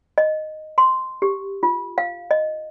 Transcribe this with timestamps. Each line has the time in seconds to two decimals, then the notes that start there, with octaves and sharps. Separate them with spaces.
0.18 D#5
0.78 C6
1.22 G4
1.63 F4
1.98 F5
2.31 D#5